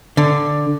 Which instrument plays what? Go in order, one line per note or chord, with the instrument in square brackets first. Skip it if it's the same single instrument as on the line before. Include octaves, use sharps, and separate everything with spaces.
[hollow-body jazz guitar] D3